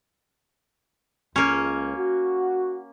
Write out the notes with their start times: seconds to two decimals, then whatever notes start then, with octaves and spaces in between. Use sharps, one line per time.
1.36 C#2 A#3 C#4
1.96 F#4